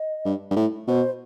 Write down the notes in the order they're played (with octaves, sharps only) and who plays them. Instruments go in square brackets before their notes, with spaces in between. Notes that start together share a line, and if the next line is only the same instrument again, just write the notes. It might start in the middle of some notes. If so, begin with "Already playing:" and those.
Already playing: [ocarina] D#5
[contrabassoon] G2
G2
A2
[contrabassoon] B2 [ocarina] C5